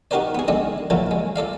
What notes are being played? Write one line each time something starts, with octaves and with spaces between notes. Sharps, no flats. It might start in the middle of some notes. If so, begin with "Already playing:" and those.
D#4 F#4 G4 A#4 C5 D5
B3 G#4
D#3 G#3 D4 A4
A#2 E3 F#3 A3 E4 F4
G#3
F4 A4 D5 F5